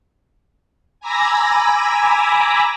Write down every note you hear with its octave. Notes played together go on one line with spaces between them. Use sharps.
G#5 A#5 B5 D6 E6 A#6